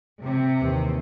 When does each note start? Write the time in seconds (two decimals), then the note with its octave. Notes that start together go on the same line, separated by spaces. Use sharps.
0.25 C3
0.61 D#2 E3